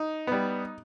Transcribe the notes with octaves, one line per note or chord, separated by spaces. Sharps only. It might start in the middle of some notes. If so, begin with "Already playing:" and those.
Already playing: D#4
G3 B3